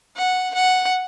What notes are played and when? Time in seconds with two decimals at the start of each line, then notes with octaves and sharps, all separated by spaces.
0.16 F#5
0.54 F#5